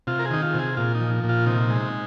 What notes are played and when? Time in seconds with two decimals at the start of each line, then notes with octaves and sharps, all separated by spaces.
0.07 C3 F4
0.19 A#4
0.25 G#4
0.31 D#3 D#4
0.43 F4
0.54 C3 G#4
0.77 A#2 F4
0.95 D#4
1.01 F3
1.24 A#2
1.29 F4
1.46 C3 D#4
1.70 G#3